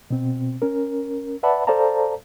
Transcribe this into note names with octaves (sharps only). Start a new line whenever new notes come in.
B2 C4
C#4 A#4
B4 D5 E5 F#5 A5 B5
A4 C5 D5 F5 A5 A#5